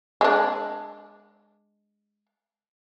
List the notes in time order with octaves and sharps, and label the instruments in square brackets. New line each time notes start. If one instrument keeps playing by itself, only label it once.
[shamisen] G#3 D4